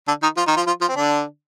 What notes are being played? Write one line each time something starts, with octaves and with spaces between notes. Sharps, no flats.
D3 D4
D#3 D#4
F3 F4
D#3 D#4
F3 F4
F3 F4
F3 F4
C4
D3 D4